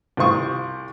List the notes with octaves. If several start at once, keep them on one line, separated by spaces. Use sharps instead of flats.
C2 F4 C5 C#6 D#6